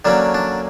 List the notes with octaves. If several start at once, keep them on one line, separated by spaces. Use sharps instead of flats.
D3 F#3 A#3 C#4 D4
D4